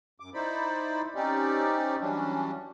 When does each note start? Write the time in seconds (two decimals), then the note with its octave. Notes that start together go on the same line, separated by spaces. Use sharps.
0.20 F#2 D6
0.34 D#4 E4 C5 D5 B5
1.15 C4 C#4 D#4 G4 D5
2.01 E3 F#3 G3 C#4 D4